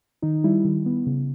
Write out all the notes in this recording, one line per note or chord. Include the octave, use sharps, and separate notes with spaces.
D#3 D#4
G3 E4
D#3
B3
C#3